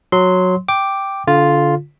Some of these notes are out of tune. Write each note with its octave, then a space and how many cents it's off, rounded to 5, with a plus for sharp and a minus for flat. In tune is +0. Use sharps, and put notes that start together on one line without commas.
F#3 -10 C6 -5 E6 -40
G5 +0 D6 +0
D3 -25 F4 +0